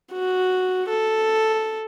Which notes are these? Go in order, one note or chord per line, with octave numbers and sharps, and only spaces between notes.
F#4
A4